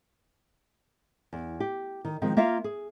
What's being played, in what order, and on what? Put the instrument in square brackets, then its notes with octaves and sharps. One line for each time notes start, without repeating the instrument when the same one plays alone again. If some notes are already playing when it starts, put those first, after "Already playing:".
[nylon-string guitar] E2
G4
D#3
D#3 F3 G#3 C4
A#3 F4 E5 F5
G#4